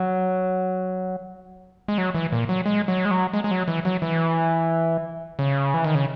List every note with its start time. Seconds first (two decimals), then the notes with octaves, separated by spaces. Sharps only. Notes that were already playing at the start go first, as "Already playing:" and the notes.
Already playing: F#3
1.88 G#3
1.98 F#3
2.15 E3
2.32 A#2
2.49 F#3
2.66 G#3
2.88 F#3
3.05 G#3
3.11 F#3
3.34 G#3
3.44 G#3
3.51 F#3
3.68 E3
3.85 F#3
4.02 E3
5.39 C#3
5.74 E3
5.84 D#3
5.95 C#3